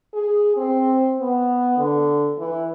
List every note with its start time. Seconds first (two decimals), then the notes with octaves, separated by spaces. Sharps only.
0.14 G#4
0.57 C4
1.20 B3
1.78 D3
2.39 E3